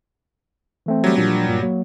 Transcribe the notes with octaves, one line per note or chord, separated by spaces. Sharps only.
E3 A3 C4
F#3 G3
A#2 F3 D4
G2 A#2
F#3 A#3